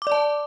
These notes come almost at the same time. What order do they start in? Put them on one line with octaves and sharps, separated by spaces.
D6 D5 A5